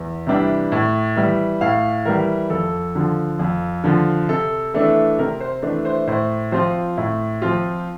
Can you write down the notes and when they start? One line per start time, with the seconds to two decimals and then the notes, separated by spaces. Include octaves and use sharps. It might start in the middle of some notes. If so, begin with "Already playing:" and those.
Already playing: E2
0.26 C3 E3 G3 D4
0.72 A2
1.16 E3 G3
1.61 A2 F5
2.05 E3 G3 A#4
2.50 F2 A4
2.95 D3 F3
3.39 F2
3.84 D3 F3
4.29 C3 A4
4.74 E3 A3 D4 A4
5.19 C3 A#4
5.40 C5
5.62 E3 A3 D4
5.85 C5
6.07 A2 C5
6.52 F3 C4 F4 C5
6.97 A2
7.42 F3 C4 F4